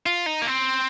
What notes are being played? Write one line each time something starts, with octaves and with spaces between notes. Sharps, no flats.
F4
D#4
A#3
C4